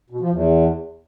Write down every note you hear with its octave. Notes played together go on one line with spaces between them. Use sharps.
B2
F3
E2